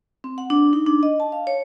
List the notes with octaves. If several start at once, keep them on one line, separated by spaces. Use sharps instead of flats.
C4
F#5
D4
D#4
D4
D#5
A5
F5
C#5